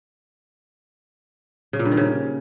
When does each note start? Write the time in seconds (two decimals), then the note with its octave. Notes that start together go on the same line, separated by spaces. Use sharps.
1.73 C#3
1.79 A#2
1.85 G2
1.91 D#3
1.97 C#3